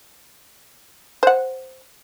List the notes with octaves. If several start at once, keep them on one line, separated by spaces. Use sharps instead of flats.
C5 F#5